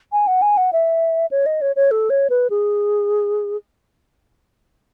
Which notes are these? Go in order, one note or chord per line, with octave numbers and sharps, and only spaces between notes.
G#5
F#5
G#5
F#5
E5
C#5
D#5
C#5
C#5
A4
C#5
B4
G#4